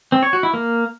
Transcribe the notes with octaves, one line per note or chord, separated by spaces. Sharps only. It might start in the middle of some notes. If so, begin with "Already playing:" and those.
C4
C#5
F#4
E4
A#3